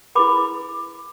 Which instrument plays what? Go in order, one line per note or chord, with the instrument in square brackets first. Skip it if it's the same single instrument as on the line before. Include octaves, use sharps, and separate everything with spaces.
[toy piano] E4 G#4 B4 B5 D6